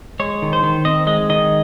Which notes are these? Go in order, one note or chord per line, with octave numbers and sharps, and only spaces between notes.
G#3 C#5
D#3
C5
D#3
C4 D#5
G#3 D#5
D#3 D#5